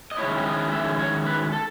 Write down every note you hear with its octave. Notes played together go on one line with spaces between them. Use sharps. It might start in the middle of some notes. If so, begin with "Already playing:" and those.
D#5
D#3 G#3 C#4 E4 C#5
D#5
E5
C#5
B4
A4